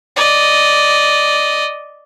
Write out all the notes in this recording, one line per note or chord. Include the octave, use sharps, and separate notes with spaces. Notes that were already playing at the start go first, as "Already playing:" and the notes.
D5 D#5